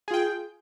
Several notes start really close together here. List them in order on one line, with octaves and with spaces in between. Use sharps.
G#4 F4 G5